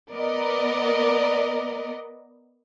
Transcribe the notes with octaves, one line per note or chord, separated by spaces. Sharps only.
B3 A#4 D5 D#5